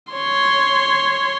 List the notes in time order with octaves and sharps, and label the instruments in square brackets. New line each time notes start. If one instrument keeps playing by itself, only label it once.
[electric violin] C#5 C6